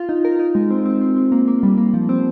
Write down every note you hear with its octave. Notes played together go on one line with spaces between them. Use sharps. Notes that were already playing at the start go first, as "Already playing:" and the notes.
Already playing: F4
D#4
A#4
D#4
G#3
C4
C4
C4
C4
A#3
A#3
G3
A#3
F3
C4